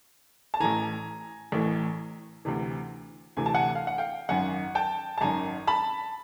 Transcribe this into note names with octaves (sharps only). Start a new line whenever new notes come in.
A5
A1 A2 E3 G#5 A#5
A1 A2 E3
D2 C3 E3
D2 C3 E3 G#5
A5
F#5 G#5
F5
F#5
F5 G5
G#1 F#2 D#3 F#5 G#5
G5 A5
A5
G#1 F#2 D#3 G#5 A#5
A5 B5